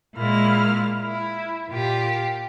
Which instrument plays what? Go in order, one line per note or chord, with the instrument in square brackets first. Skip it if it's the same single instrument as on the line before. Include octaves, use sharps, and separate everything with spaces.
[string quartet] A#2 G#3 A#3 E4 F6
E4
A#2 F4 G4